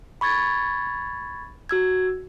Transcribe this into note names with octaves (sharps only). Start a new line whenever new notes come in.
B5 C#6 G#6 A6
F#4 E6 G#6